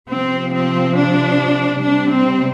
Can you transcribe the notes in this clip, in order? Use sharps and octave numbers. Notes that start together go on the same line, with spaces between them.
C3 F3 C4
C4
D4
C3 G3 D4
C4